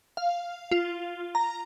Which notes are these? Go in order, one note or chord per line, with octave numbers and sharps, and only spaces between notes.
F5
F4
A#5